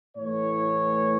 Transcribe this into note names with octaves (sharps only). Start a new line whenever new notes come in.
A2 E3 A3 C#5